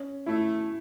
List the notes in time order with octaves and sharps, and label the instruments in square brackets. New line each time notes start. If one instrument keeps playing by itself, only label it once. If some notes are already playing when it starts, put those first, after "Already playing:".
Already playing: [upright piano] C#4
[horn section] A3 [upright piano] E4